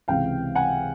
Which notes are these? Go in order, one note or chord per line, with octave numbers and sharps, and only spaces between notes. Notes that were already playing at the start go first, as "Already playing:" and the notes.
C#2 C3 E3 F5 G5
F#5 G#5